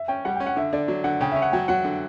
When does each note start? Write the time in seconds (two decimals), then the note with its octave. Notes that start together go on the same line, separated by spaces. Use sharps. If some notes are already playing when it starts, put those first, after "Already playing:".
Already playing: E5
0.08 C#4 G5
0.25 G3 F#5
0.36 C#4 G5
0.46 F#5
0.56 D3 E5
0.73 D3 D5
0.88 F#3
1.04 D3 F#5
1.21 C#3 G5
1.32 C#4 E5
1.42 F#5
1.52 F#3 G5
1.68 F#3 F#5
1.84 D3